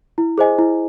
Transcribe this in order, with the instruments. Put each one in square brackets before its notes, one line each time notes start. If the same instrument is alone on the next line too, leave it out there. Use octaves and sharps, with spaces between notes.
[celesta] E4
G#4 C5 D#5 G#5
E4